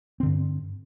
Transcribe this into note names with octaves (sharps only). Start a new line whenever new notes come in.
G2 D3 C4